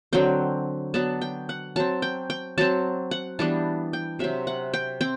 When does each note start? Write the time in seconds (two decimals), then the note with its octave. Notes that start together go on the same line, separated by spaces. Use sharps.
0.13 D3 F#3 C4 G5
0.94 F#3 B3 D4 A5
1.22 G5
1.49 F#5
1.76 F#3 C4 A5
2.02 G5
2.30 G5
2.58 F#3 C4 A5
3.11 F#5
3.39 E3 G3 B3 D4 A5
3.93 G5
4.19 C3 F#3 C4 E5
4.47 F#5
4.74 G5
5.01 C4 G5